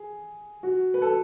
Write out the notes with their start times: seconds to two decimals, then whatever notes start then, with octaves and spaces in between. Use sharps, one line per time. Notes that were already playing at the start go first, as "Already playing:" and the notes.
Already playing: G#4
0.63 F#4
0.94 B4
1.02 A4